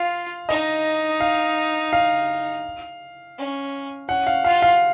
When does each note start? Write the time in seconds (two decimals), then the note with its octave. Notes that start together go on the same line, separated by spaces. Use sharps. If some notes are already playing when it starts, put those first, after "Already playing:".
Already playing: F4 F5
0.49 D#4 D#5
1.20 F5
1.93 F5
3.37 C#4
4.09 C#4 F#5
4.27 F5
4.44 F4 F5
4.62 F5